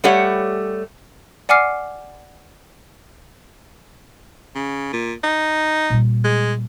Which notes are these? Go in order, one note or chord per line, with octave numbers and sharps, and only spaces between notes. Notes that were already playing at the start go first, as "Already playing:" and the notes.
G3 A3 G4 C#5 F#5
D5 F#5 G#5 D6 F6 C7
C#3
A#2
D#4
A#2 G3
G#3